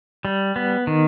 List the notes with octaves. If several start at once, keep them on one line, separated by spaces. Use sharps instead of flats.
G3
B3
D#3